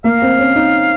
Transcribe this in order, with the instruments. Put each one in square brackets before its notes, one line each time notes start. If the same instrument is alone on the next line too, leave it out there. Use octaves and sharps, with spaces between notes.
[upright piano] A#3 [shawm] F5
[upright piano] C4
C#4
D#4